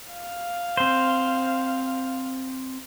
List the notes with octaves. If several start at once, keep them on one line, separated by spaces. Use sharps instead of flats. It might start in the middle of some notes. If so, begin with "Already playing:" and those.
F5
C4 C5